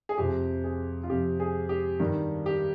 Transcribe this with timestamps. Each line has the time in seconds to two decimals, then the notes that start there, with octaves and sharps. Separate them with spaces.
0.09 G#4
0.18 F2 C3 F3 G4
0.64 G#4
1.04 F4
1.09 F2 C3 F3 G4
1.40 G#4
1.69 G4
2.00 G2 D#3
2.46 G4